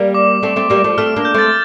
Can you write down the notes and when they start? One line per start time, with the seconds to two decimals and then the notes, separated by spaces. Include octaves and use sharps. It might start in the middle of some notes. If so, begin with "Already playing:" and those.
Already playing: G3 A#3
0.14 D6
0.43 A3 C4
0.56 A3 C4
0.70 G3 A#3
0.84 F3 A3
0.98 A3 C4 F6
1.16 A#3 D4
1.25 G6
1.34 A3 C4 A6